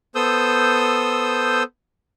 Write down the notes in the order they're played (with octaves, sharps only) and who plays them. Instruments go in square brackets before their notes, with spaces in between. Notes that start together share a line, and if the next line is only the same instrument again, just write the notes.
[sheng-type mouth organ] B3 A4 C5 D#6 E6 G6